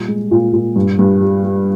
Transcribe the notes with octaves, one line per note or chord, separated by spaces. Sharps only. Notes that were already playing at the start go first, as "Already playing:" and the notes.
Already playing: A#2 G3
G#3
A#2
A#2
G2
G2
G3
G3